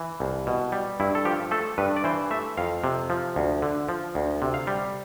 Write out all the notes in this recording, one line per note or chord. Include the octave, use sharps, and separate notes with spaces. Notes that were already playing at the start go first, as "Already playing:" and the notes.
Already playing: E3
C2
B2
G3
G2 E4
A4
F3 G4
A3 A4
G2 B4
D5
E3 C5
A3 E5
F2 F5
C3
F3
D2
D3
F3
D2
C3
F5
G3